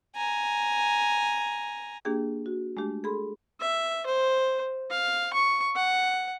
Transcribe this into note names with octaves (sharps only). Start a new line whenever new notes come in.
G#5 A#5
A#3 D4 G4 G#4 G5
F#4
G#3 A3 D4 G4
G#4 A4 B5 C6
E5
C5
F5
C#6
F#5